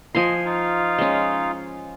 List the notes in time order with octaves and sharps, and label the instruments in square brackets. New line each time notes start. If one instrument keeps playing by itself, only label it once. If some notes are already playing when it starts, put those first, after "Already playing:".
[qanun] F3 G#5 C6 [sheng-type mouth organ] D#5
[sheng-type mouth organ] D#4 F4 F5
[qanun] G#3 C#4